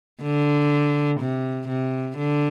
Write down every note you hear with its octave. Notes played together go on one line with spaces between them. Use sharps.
D3
C3
C3
D3